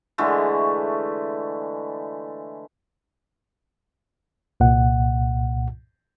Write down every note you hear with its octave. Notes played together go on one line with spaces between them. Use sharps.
D3 E3 G#3 A3
C2 A#2 F#5